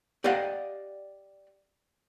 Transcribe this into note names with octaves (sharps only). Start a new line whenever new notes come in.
G4 D5 D#5 F5 F#5